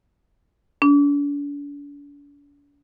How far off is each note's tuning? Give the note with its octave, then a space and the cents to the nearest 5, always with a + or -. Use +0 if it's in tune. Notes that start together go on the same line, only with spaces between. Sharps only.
D4 -45